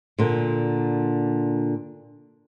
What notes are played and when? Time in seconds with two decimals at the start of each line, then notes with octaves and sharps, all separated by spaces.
0.19 A#2 D3